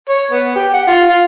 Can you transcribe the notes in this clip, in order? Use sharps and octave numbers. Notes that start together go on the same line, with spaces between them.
C#5
B3
G4
F#5
F4
F4